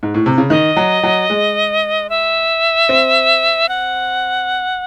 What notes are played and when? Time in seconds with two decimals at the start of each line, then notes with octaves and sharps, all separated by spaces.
0.03 G#2
0.14 A2
0.26 C3
0.38 C#3
0.50 D#3 D#5
0.77 F#3
1.03 F#3
1.30 G#3
2.10 E5
2.89 C4
3.69 F#5